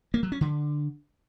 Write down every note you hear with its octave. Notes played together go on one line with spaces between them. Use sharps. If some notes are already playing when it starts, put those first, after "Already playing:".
A#3
F#3
C#4
D3